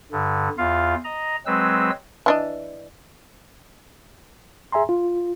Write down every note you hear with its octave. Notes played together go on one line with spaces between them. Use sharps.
G2 D3
E2 F4 F5
D#5 A#5
F#3 G#3 C4 B4 E6
E3 D4 D#5
G#4 E5 G#5 A#5 C6
F4